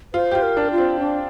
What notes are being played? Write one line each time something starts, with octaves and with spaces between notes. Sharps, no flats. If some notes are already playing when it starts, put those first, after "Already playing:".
F4 C5
G4
F4
A#4
D4
F4
C4
D4